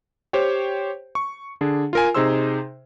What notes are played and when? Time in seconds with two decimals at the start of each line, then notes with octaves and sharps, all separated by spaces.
0.33 G4 C5 C#5 G5
1.15 C#6
1.61 D3 D4 G#4
1.93 F4 A#4 G#5
2.14 C3 D#4 G#4 C5 C6 E6